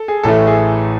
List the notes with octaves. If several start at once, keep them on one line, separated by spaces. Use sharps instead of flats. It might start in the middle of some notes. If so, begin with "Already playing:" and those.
Already playing: A4
G#4
A1 A2 E3 A3 A4
G#4